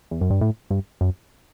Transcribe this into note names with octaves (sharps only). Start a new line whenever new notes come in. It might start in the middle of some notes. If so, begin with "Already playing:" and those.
E2
F#2
G2
A2
G2
F#2